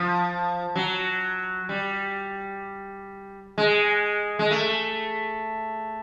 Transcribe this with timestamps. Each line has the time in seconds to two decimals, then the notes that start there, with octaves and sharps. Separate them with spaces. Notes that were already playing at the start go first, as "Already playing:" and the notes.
Already playing: F3
0.76 F#3
1.69 G3
3.58 G#3
4.39 G#3
4.51 A3